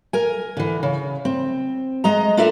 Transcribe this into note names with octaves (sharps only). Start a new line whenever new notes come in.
A#4 G#5
D3 E3
C#3
C4
G#3 D#5 A#5
D4 F4 A4 A#4 D5 E5